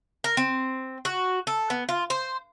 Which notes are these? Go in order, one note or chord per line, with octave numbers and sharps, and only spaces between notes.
A#4
C4
F#4
A4
B3
F4
C5